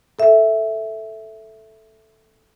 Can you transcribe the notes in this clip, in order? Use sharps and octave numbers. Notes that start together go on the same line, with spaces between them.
A4 E5